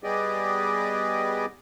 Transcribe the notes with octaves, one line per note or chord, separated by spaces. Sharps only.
G3 B3 G4 G#4 D5 D#5